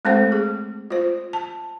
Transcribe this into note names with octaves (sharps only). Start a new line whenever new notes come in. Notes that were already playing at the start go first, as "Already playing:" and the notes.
G#3 A3 C4 A4 C5
G#4
F4 C5
A5